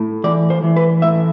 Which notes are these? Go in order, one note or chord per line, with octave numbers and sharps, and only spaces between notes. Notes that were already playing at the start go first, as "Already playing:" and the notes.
Already playing: A2
E3 D5
C5
E3
B4
A2 E5